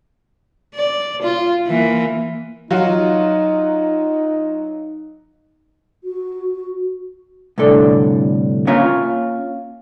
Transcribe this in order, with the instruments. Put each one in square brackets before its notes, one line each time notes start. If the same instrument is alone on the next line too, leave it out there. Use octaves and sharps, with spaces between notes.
[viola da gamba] D5
F4
E3 A#3
[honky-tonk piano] F#3 F4 F#4 [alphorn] D#4
[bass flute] F#4
[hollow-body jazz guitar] C2 A2 D3 A4 D5
A#3 C#4 F4 C#5 E5 A#5